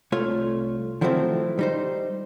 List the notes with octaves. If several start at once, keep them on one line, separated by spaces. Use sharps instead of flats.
C2 A3 F4 C#5
D#3 F3 F#3 A3 C4 E4
G3 D#4 C5